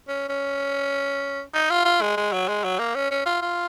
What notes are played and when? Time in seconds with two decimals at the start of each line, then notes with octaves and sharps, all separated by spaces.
0.08 C#4
0.29 C#4
1.54 D#4
1.70 F4
1.85 F4
2.02 G#3
2.17 G#3
2.33 F#3
2.48 G#3
2.64 F#3
2.79 A#3
2.95 C#4
3.11 C#4
3.26 F4
3.42 F4